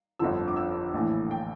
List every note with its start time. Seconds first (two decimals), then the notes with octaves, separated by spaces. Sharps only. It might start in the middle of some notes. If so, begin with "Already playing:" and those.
0.19 G1 F2 D3 F3 E6
0.48 D6
0.57 E6
0.94 A#1 A2 E3
1.31 G5